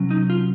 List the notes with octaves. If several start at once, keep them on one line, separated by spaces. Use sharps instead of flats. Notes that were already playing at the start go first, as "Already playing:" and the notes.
Already playing: C3 F#3 C#4
D#4
F4